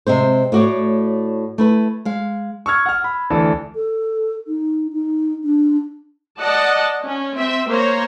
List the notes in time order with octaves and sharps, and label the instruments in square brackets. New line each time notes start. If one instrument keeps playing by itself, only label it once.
[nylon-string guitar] C3 G#3 C4 C5
A2 A3 F#4 C#5 D5
A3 E4 B4
G#3 F5
[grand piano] C#6 E6 F6 G#6
F#5 F6
B5
D2 E3 D4 A4
[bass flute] A4
D#4
D#4
D4
[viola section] D5 D#5 F#5 A5
C#4
C4 E5
A#3 C5 C#5 A#5